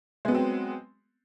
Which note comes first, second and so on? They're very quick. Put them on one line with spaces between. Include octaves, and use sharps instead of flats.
G#3 B3 F#3 C4